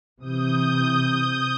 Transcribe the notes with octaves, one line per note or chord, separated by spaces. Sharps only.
C3 E3 D#6 G6